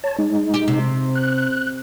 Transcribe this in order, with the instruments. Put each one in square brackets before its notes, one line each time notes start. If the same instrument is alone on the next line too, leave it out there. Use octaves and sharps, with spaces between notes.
[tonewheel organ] C#5 A5
G#3 D#4
[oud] G4
C3
[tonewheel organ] F#6